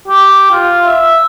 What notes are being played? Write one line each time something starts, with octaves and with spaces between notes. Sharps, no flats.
G4
F4
E5